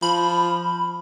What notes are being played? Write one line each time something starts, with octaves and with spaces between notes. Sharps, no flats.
F3 B5